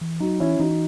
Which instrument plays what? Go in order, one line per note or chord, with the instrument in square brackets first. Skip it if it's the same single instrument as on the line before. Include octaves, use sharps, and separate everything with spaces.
[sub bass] E3
[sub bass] F#3 [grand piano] D#4 F#4
[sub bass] E3 [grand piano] C#4 E4
[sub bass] E3 [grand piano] D#4 F#4